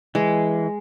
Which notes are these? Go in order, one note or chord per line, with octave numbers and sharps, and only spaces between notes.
E3 G#3